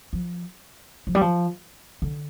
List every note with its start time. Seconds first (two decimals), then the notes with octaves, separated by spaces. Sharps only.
0.13 F3
1.07 F3
1.15 G3
1.21 F3
2.02 D3